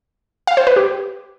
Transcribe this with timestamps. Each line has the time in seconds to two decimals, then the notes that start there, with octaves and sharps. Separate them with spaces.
0.47 F5
0.57 C5
0.67 B4
0.76 G4